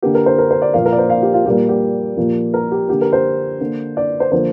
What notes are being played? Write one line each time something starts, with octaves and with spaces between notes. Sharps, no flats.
D3 A#3 G4
A#4
C5
A#4
C5
D5
A#2 F3 A#3 F5
A#4
D5
C5
F5
G4
F4
A#2 G3 A#3 G4
G4
A#2 F3 A#3
A#4
G4
D3 A#3 G4
A#4
C5
D3 A#3
D5
C5
D3 F3 A#3 C5